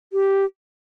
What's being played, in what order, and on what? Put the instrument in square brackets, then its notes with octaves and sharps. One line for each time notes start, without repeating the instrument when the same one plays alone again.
[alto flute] G4